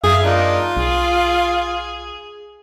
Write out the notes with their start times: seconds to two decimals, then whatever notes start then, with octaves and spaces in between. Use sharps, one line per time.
0.04 F#2 G#4 E5 F5
0.23 A#3 D4 D#4 F4
0.77 B1 G#4